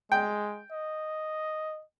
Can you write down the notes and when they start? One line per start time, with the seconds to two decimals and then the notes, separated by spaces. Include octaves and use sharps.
0.12 G#3 G5
0.72 D#5